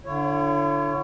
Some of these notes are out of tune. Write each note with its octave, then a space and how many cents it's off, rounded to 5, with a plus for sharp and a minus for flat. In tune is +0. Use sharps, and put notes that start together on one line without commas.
D3 +0 E4 +45 C#5 -5